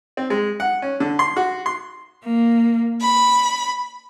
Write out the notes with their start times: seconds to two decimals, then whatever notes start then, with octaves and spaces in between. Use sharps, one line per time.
0.17 C4
0.30 G#3
0.60 F#5
0.82 C#4
1.00 D3
1.19 C6
1.36 F#4
1.66 C6
2.22 A#3
3.00 B5